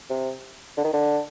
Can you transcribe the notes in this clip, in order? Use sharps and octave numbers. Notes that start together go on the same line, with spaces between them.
C3
D3
D#3
D3